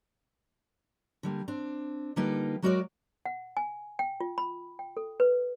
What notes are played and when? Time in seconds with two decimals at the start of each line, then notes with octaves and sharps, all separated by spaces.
1.23 D3 G3 A#3
1.48 C4 D4
2.16 D3 G3 A#3 D#4 F4 B4
2.62 F#3 G#3 F#4 A#4 C#5 D5
3.26 F#5
3.57 G#5
3.99 G5
4.21 F4
4.38 B5
4.79 G5
4.97 A4
5.20 B4